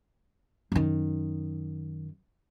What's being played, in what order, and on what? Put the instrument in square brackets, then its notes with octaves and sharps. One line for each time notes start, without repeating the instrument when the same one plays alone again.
[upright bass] F#2 D#3